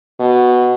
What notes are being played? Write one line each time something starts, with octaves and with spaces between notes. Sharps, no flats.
B2